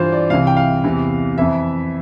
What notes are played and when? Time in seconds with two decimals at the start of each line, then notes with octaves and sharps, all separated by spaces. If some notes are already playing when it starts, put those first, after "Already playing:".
Already playing: G2 E3 F4 C5
0.12 D5
0.30 C2 C3 E3 F5
0.47 G5
0.57 F5
0.84 E2 C3 E3
1.38 F2 E3 E5